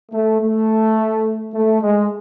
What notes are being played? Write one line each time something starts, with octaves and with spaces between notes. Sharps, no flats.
A3
A3
A3
G#3